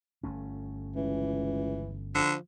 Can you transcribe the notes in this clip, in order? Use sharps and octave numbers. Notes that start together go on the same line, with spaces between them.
G1 A3 C#4
C#2 E3
D3 F3